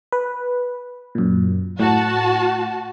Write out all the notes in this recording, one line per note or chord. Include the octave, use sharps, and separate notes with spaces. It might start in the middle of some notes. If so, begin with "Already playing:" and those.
B4
F#2 A#2
A2 F#4 A5